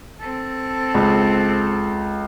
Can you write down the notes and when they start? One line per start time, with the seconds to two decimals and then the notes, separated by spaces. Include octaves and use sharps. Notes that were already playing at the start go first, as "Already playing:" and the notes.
0.20 C4 A4
0.94 C#2